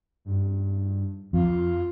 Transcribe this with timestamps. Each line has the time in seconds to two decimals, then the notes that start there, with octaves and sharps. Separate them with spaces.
0.25 G2
1.33 F2 F4